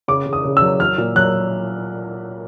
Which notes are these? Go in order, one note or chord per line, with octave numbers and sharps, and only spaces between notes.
C#3 D6
C#3
D#6
C#3
E6
F#3
F#3 F6
A#2
F#3 F#6